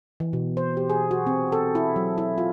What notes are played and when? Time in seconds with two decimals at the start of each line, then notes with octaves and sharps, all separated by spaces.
0.20 E3
0.33 B2
0.57 C5
0.77 G4
0.90 G#4
1.11 F#4
1.27 C4
1.52 A4
1.75 E4
1.96 F#3
2.18 E4
2.38 F4